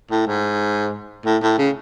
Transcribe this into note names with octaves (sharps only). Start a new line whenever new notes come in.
A2
G#2
A2
A2
C#3